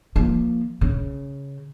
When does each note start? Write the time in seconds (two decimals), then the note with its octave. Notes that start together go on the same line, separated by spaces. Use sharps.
0.15 F3 A#3
0.81 C#3